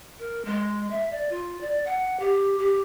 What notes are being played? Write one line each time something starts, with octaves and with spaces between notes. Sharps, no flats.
A#4
G#3
E5
D5
F4
D5
F#5
G4
G4